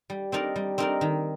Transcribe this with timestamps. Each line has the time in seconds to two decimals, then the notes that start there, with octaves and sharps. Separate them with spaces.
0.10 G3
0.32 C4 D#4 A#4 D5
0.56 G3
0.78 C4 D#4 A#4 D5
1.01 D#3